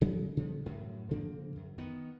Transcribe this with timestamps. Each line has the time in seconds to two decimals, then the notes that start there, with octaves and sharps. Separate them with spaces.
0.01 C#3 F#3 G#3 B3
0.37 C#3 F3 G3 B3
0.66 F#2 A2
1.11 C#3 F3 A#3 C4
1.56 F#2
1.78 D#3 B3